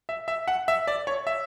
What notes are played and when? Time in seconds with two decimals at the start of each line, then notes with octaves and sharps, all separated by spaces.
0.09 E5
0.28 E5
0.48 F#5
0.68 E5
0.87 D5
1.07 C#5
1.27 E5